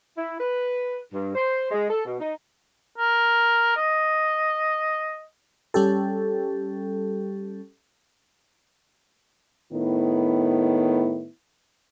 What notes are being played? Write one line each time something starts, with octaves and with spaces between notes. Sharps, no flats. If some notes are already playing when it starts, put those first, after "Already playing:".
E4
B4
G2
C5
G#3
A4
B2
D#4
A#4
D#5
G3 C#4 G4 A4
A2 D#3 B3 E4